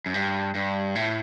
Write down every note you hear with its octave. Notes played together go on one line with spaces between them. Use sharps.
F#2
G2
G2
A2